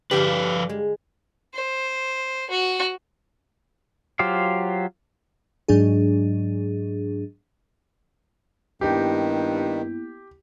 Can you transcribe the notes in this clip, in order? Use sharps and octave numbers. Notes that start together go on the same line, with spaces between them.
G2 D3 F3 F4 G4 B4 F5
G#3
C5
F#4
F#3 F4 G4 C5 F5
G#2 F#3 D4 G#4
G2 D#3 A#3 B3 E4 G4